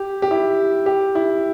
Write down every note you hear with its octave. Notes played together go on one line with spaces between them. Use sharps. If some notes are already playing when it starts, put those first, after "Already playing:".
Already playing: G4
G4
E4
G4
E4